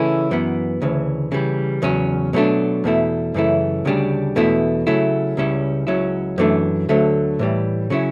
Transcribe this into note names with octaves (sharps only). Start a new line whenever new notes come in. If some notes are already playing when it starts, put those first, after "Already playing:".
Already playing: C#3 E3 A3 C#4 E4
F#2 E3 B3
D2 C#3 E3
C#3 E3 G3
E2 C#3 F#3 C#4
B2 F#3 A3 D4
E2 B2 A3 E4
F#2 C#3 E3 A3 E4
D2 C#3 G3 D4
E2 B2 A3 E4
C#3 F#3 A3 E4
C#2 C#3 G3 C#4 E4
C#2 C#3 F#3 C#4 E4
F#2 E3 A3 D4
D2 D3 F#3 A3
A2 E3 G3
C#3 F#3 C#4 E4